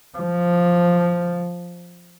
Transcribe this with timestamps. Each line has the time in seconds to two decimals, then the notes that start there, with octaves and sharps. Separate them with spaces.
0.18 F3